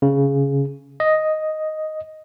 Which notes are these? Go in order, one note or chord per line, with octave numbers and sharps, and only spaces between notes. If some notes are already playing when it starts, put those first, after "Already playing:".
C#3
D#5